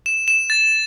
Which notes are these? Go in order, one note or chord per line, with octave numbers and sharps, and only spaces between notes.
E7
E7
A6